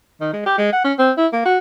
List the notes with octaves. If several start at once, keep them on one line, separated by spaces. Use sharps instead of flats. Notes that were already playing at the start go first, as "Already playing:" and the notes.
D#3
G#3
G4
G#3
F#5
C#4
C4
E4
A#3
F#4